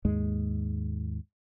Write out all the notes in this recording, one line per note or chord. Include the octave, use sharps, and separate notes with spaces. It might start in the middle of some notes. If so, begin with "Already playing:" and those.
D#2 G#2 G#3